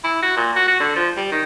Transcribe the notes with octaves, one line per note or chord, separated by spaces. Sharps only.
E4
F#4
A#2
F#4
F#4
D3
F3
G3
D#3